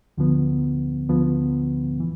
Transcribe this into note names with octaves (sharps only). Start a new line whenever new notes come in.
D2 D3 F3 B3
D2 D3 F3 B3
E3